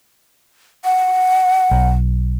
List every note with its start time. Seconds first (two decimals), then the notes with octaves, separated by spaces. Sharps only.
0.85 F#5
1.71 B1